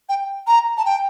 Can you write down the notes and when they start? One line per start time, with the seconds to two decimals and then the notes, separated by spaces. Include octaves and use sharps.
0.09 G5
0.47 A#5
0.77 A5
0.85 G5